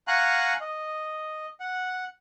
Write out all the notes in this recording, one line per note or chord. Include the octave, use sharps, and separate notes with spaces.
F5 F#5 G#5 A#5 C#6 F#6
D#5
F#5